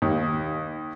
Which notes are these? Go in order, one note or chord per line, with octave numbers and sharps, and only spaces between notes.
D#2